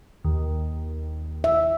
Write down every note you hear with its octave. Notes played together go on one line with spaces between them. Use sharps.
D#2
E5